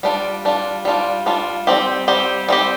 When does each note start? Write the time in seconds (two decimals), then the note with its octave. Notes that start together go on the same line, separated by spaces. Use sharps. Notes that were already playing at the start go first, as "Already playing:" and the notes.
0.03 G3 D4 F4
0.45 G3 D4 F4
0.85 G3 D4 F4
1.26 G3 D4 F4
1.67 G3 C4 G4
2.08 G3 C4 G4
2.49 G3 C4 G4